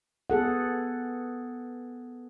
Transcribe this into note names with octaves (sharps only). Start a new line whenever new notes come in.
B3 G#4 A4 F#5